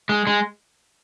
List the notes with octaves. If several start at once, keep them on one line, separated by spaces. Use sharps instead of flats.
G#3
G#3